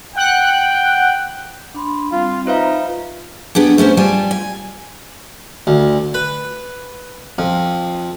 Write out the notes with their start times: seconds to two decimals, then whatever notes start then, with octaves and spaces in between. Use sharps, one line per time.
0.16 F#5 G5 F#6
1.74 D4 B5 C6
2.12 G3 C4 F4 F5
2.47 D#4 F4 B4 C5 E5 F5 A#5
3.55 B3 D4 G4 G#4
3.78 A3 B3 C#4 C5
3.97 G3 F4 G4 G#5 A5
4.31 G#5
5.67 D2
6.14 B4
7.38 F2